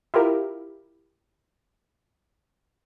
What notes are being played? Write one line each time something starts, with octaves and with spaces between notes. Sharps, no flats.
E4 F4 G4 A#4